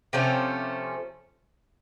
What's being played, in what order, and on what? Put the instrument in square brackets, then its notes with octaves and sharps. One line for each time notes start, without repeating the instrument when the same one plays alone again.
[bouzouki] C3 F3 A3 C#4